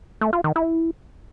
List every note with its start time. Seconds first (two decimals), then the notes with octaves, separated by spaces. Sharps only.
0.21 A3
0.33 F4
0.44 D#3
0.56 E4